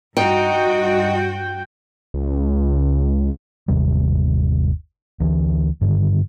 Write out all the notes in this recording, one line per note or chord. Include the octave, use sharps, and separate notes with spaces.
G2 D#4 F#4 G5
C#2
G1 D#2 C3 G3
D2 E3
G2 D3 D#3